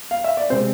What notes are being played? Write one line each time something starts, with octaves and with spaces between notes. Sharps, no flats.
F5
E5
D5
C3 G#3 C4 C5